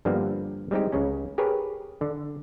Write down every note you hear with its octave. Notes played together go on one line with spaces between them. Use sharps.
G2 D3 F3 G3 A#3 B3
G3 G#3 C4 D#4 G4
C#2 C#3 C#4
G4 G#4 A#4 B4 C#5
D3